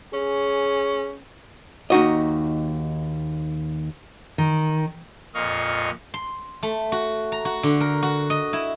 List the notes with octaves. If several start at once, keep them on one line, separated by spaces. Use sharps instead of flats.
C#4 G#4
D#2 D#4 F#4 D#5
D#3
F2 A#2 D#5 F5 C#6
C6
A3
F#4
A#5
F#4
D3
A#4
F#4
D#5
E4